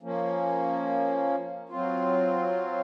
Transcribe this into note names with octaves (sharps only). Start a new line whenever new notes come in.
F3 A#3 C#4
F#3 C4 F4